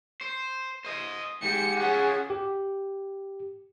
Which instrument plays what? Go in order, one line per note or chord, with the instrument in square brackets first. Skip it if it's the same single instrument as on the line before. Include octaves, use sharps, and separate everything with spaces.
[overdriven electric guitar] C5
C5 D#5
[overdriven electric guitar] G#2 [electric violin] G4 C#7
[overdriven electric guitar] C#4 F4 [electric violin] G#4 F#5
[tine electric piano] G4